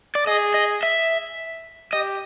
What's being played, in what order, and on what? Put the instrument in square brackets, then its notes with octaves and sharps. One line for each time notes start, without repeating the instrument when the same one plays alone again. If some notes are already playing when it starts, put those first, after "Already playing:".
[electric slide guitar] D5
[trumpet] G#4 [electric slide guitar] D#5
[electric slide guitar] D#5
E5
[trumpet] G4 [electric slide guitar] D#5